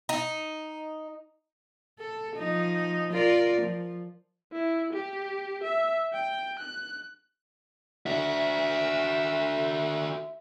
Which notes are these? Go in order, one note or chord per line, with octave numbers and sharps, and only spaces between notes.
D#4
A4
F3 D#4
F4 A#4 D5
F3
E4
G4
E5
G5
F#6
D4 F#4 E5